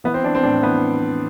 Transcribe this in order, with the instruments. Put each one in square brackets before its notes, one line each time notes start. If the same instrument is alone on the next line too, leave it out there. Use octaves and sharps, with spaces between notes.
[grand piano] E3 B3
C4
E3 D4
C4
A2 D4
E3 B3